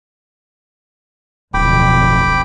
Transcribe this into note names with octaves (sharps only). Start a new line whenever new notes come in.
D1 B1 F2 G5 B5 D6